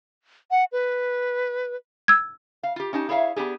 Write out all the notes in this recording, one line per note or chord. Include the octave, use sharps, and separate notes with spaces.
F#5
B4
E6 G#6
F5
F4 G4
C#4 D#4 G4 A5
E4 G#4 C#5 E5 F5
B3 D4 G4 G#4